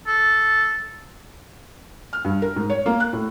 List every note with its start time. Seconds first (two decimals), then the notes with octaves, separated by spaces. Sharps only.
0.07 A4
2.13 F6
2.25 G2
2.42 A#4
2.56 G#2
2.70 C#5
2.86 A#3
3.00 F#6
3.13 A2